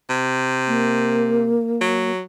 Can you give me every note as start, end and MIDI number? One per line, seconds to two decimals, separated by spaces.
0.10 1.56 48
0.68 2.11 58
1.81 2.21 54